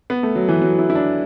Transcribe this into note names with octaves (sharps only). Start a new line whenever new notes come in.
B3
A3
F#3
E3
F#3
E4
E4
D4